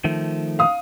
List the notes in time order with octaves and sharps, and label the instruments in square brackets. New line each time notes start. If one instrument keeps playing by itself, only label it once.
[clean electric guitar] D#3 F3 A3
[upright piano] F5 D#6